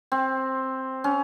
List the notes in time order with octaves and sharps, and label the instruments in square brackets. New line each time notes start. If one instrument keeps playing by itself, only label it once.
[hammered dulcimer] C4
C#4